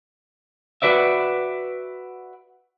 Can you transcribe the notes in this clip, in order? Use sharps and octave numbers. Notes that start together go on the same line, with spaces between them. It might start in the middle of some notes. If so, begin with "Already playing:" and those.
F#4 B4 D5 E5